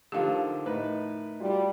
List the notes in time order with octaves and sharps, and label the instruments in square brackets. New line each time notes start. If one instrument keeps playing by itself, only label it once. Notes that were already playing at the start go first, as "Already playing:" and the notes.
[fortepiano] D3 D#3 F3 [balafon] G4 F5
[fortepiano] A2 B4 [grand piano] D#4 A#4 D#5
[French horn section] G3 [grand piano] F4 F#4